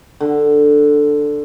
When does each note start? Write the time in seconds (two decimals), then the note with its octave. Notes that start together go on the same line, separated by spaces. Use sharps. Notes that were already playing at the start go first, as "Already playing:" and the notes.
0.20 D3